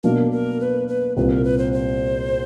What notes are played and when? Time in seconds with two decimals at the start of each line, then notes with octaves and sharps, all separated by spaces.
0.04 B2 F#3 A#3 D4 A#4
0.32 A#4
0.60 B4
0.88 B4
1.17 C2 A#2 G3 C4 F4 B4
1.30 A#4
1.44 B4
1.58 C5
1.73 C5